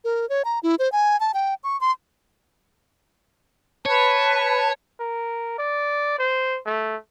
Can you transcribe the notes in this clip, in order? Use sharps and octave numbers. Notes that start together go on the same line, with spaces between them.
A#4
C#5
A#5
E4
C5
G#5
A5
G5
C#6
C6
B4 C#5 A5
A#4
D5
C5
A3